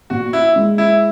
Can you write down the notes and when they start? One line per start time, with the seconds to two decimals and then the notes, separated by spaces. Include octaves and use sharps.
0.10 A#1 F#4
0.33 E4
0.56 G#3
0.78 E4